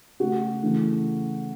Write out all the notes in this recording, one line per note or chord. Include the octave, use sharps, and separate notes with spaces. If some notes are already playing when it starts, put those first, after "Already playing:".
C#3 A3 F#4
C#3 E3 A3